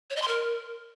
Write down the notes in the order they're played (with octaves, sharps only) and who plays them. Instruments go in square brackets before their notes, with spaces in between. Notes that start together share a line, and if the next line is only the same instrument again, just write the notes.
[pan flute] C#5
D#5
C6
A#4